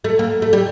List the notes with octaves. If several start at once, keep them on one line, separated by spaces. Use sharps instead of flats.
A3
A#3
A3
G3